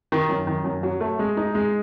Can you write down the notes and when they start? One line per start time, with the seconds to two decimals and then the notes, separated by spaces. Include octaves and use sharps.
0.12 D#3
0.29 F#2
0.47 D#3
0.64 F#2
0.83 F#3
1.01 A3
1.19 G#3
1.37 D#4
1.55 G#3